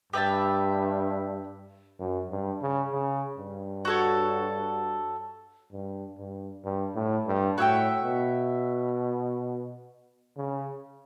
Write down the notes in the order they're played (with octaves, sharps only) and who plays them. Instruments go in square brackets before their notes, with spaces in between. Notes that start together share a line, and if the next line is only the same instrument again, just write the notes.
[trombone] G2 [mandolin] G4 B4 E5 A5
[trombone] F#2
G2
C#3
C#3
G2
[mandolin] F#4 A4 C#5
[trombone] G2
G2
G2
A2
G2
[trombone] A2 [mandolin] F#4 C#5 E5 G5
[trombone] B2
C#3